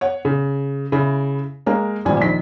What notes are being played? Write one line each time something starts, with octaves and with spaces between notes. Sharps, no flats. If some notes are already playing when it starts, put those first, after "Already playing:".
C#5 F#5
C#3
C#3 E4
G#3 A#3 A#4
G#1 E2 A#2 G3 G#5
A#1 D#3 B6